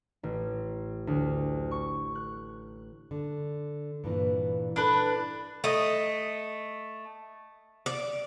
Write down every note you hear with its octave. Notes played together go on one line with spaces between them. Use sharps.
A1
D2
C#6
F#6
D3
G2 A#2 E3
D4 E4 A4 B4
A3 D#5
D5